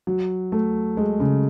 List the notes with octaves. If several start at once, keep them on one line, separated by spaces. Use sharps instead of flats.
F#3
A3
G#3
C#3